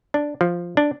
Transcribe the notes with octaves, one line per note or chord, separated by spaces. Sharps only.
D4
F3
D4